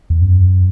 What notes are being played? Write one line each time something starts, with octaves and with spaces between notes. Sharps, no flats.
E2
F#2